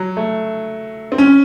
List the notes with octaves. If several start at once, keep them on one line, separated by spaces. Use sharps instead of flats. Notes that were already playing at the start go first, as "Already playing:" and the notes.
Already playing: F#3
A3
C4
C#4